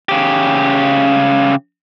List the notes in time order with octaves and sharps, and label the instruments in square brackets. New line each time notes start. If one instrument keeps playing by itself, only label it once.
[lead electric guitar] C#3 G4